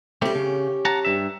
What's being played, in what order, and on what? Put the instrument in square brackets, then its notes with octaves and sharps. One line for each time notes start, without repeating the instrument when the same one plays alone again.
[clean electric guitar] G3 A3 C4 [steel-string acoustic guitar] C#4 G4
[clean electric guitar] C#3
F#5 A5 A#5
G2 E5